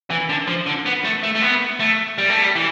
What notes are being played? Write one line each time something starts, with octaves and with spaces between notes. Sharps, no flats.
E3
D3
F3
D3
B3
A3
A3
A3
B3
A3
G3
A3
G3
E3